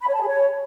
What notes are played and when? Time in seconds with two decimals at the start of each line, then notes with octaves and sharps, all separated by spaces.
0.01 B5
0.08 C#5
0.14 A5
0.21 G#4
0.28 C#5